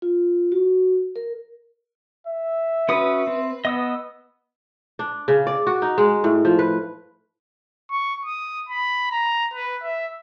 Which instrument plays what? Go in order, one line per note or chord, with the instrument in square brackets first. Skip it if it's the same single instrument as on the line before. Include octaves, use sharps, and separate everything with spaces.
[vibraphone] F4
F#4
A#4
[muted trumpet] E5
[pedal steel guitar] C#4 F#4 D#6 [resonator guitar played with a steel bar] B4
[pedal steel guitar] C4
[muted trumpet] B3 [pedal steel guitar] D#5 D#6 E6
[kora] D4
C#3
D5
F#4
D#4
G#3
A2
F3
B4
[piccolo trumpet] C#6
D#6
B5
A#5
B4
E5